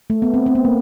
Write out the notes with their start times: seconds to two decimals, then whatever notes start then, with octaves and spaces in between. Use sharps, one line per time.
0.10 A3
0.22 B3
0.34 C4
0.46 C4
0.55 B3
0.65 A#3